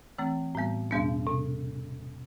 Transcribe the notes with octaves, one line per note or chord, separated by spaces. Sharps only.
E3 A3 C4
A2 G3 B3
E2 B2 G3 B3 D4
C3